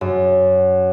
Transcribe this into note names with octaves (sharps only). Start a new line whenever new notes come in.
F#2